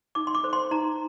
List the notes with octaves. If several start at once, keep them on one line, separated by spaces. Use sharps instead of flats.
D#4 D6
C6
D6
A4 C5
C6
D#4 A#5